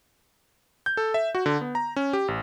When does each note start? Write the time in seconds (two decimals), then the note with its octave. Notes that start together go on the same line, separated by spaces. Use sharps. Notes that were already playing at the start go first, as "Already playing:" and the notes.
0.86 G6
0.97 A4
1.14 E5
1.35 F#4
1.46 D3
1.61 B3
1.75 A#5
1.96 C#4
2.13 G4
2.28 A1